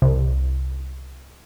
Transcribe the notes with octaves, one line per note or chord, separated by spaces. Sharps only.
C2